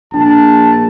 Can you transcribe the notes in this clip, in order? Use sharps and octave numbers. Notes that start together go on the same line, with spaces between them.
A#1 D4 A5